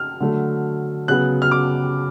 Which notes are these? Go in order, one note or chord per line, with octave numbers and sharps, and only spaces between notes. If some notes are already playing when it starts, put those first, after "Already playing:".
Already playing: F6
D3 F#3 A3
C#3 F#3 B3 F#6
F6
D6